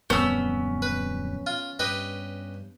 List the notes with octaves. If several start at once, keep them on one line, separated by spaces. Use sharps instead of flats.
D1 F2 G3 B3 C#4 E6
B4
F4
G2 G4 B4 D#5